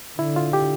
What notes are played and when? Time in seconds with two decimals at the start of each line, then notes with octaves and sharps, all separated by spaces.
0.19 D3 E4
0.36 F4
0.53 G4